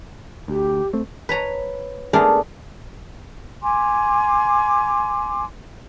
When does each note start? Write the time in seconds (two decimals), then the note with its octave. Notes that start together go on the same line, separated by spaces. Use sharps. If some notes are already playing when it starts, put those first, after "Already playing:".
0.48 D2 G4
0.93 A3 C4
1.29 B4 C#5 A#5
2.13 A3 B3 D4 G#4 A#4 F#5
3.62 G#5 C6 D6